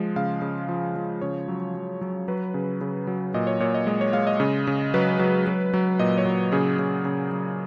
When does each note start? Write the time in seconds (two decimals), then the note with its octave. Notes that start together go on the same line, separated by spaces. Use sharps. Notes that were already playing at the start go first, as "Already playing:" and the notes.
Already playing: F3 G#3
0.16 C#3 F5
0.42 C#3
0.69 F3
0.96 F3
1.22 C#3 C#5
1.48 F#3
1.74 F#3
2.01 F#3
2.28 F#3 B4
2.54 C#3
2.81 C#3
3.07 F#3
3.34 A#2 D#5
3.47 C#5
3.60 A#2 C#5
3.75 D#5
3.87 G#3 D#5
4.01 C#5
4.13 G#3 F5
4.27 D#5
4.40 C#3
4.67 C#3
4.94 F#3 B4
5.19 F#3
5.47 F#3
5.74 F#3
5.99 A#2 D#5
6.18 C#5
6.25 F#3
6.52 C#3 G#4
6.79 C#3
7.05 C#3
7.32 F#3